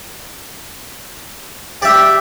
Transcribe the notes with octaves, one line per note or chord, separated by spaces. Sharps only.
G4 D5 E5